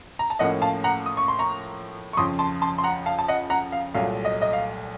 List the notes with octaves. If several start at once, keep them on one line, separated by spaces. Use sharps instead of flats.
A#5
A5
A2 F3 A#3 C#4 D#5 F#5
F5 A5
F#5 A#5
D#6
C#6
C6
A#5 C#6
C#6
F2 C#3 F3 C6 D#6
A5 C6
A5 C6
C6
F#5 A#5
F5 A5
A5
D#5 F#5
F#5 A#5
F5
C2 A#2 F#3 A3 F5
D#5
D#5
F5